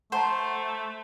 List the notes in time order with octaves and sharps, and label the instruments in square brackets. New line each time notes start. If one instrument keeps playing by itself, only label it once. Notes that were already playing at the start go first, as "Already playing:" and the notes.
[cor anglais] A3 [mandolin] C5 [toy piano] F#5 A5 A#5